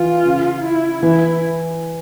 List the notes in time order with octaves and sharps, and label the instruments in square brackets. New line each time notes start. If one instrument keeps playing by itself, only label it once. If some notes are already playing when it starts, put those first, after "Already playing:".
Already playing: [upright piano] E3 [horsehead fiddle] F4
[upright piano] C#3
[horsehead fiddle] E4
[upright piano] E3 [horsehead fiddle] E4